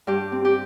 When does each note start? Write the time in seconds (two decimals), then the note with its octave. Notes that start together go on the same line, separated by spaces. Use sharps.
0.07 G2 G4
0.32 C4
0.45 G4